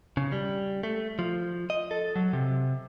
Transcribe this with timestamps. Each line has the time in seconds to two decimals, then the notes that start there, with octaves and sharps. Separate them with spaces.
0.17 C#3
0.32 G3
0.83 A3
1.19 F3
1.70 D#5
1.91 A4
2.16 F#3
2.33 C3